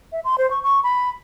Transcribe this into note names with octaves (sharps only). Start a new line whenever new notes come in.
E5
C6
C5
C#6
C#6
B5